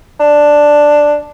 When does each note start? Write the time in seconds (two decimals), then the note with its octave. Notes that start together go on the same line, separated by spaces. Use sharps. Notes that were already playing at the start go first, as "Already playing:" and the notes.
0.20 D4